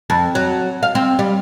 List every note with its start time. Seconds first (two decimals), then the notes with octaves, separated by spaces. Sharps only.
0.10 F2
0.35 F#3
0.83 F5
0.95 C4
1.19 G3